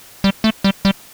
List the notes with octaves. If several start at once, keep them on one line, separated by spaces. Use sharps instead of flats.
G3
A3
G3
G3